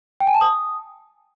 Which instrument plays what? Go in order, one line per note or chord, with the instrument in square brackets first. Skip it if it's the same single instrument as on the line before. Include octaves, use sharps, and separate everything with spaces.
[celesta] G5
G#5
A5
D#6